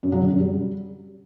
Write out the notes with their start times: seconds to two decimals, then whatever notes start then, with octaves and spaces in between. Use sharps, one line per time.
0.03 F#2
0.12 F#3
0.21 D3
0.31 F#2
0.40 G3